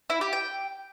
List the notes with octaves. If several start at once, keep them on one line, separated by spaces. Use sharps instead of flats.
E4
G4
G5